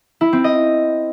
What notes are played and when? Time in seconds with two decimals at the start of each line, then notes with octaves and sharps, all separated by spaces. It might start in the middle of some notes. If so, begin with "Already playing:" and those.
0.21 E4
0.33 C4
0.44 D#5